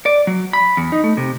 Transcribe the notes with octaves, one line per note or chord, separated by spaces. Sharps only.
D5
F#3
B5
E2
D#4
A3
C3